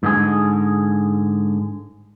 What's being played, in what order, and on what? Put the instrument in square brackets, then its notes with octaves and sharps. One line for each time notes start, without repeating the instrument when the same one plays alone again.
[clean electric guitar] G#2 D3 G#4